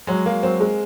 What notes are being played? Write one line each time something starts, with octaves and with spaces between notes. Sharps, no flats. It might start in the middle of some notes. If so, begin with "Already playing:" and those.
F#3 G#3
F#3 A#3
F#3 C4
G#3